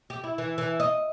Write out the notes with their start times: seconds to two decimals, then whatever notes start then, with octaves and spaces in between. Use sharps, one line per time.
0.10 G4
0.24 E4
0.38 E3
0.58 E3
0.80 D#5